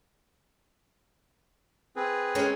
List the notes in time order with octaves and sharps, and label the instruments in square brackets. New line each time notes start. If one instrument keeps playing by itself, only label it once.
[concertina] C4 G#4 B4
[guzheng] G#3 C#4 A#4